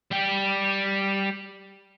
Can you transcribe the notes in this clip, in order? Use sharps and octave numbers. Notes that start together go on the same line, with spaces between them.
G3 G5